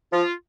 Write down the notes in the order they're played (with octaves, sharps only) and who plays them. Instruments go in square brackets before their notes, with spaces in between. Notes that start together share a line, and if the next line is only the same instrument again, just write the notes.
[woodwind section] F3 F4